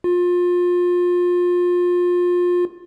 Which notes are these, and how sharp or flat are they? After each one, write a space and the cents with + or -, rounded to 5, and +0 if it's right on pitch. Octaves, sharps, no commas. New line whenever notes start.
F4 +25